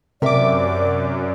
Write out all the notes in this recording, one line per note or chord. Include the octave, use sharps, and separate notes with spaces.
F#2 C3 A#4 D5 E5 D6